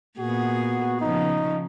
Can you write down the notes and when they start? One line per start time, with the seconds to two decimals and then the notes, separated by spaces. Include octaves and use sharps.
0.19 A#2 B3 F#4 G#4
1.01 C#3 F3 D#4